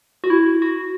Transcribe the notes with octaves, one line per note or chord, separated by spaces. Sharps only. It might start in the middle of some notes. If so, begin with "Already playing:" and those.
F#4
E4
F#4